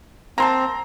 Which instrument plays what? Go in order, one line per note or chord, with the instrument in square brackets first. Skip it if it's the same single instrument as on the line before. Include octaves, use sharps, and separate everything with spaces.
[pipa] A#3 A#4 A5 [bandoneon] C4 [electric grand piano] A#5 C6